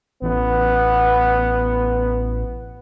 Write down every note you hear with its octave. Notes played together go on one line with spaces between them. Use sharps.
A1 B3